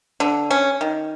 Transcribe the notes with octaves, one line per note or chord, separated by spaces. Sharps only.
D3
C#4
D#3